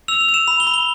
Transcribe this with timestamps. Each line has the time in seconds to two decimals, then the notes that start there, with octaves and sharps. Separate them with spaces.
0.08 E6 F7
0.21 F7
0.28 E6
0.34 E7
0.47 B5 F7
0.60 G7
0.67 B5
0.74 G7